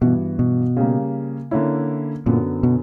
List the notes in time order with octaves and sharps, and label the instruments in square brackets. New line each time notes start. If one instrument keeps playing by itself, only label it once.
[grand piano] G2 E3 B3 F#4 [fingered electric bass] B2
[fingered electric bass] B2
[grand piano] C#3 G3 A#3
D3 A#3 C#4 E4
[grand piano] F#2 D3 F#3 B3 [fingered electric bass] A#2
[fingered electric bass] B2